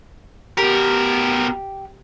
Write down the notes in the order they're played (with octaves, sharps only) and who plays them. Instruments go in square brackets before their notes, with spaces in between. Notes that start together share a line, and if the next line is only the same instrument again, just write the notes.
[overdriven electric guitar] B2 A#4 [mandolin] G4